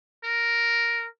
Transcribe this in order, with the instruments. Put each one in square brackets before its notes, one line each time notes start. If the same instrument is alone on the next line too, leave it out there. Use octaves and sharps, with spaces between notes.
[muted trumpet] A#4